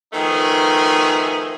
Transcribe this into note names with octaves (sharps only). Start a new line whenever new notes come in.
B2 D#3 F3 A3 D#4 G#4